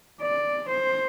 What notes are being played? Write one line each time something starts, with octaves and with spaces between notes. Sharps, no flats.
D5
C5